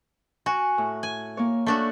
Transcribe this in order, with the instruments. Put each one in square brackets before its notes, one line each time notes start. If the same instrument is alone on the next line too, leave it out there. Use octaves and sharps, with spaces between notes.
[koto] F#4 [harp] G#5
[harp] A2
[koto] G#5
[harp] A#3 C#5
[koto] A3 D4 F#4